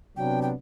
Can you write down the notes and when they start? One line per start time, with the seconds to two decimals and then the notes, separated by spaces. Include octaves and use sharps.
0.17 C3 F#3 B3 D4 G5
0.42 G5